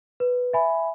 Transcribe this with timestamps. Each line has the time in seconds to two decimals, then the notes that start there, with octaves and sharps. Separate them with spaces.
0.20 B4
0.53 E5 G#5 B5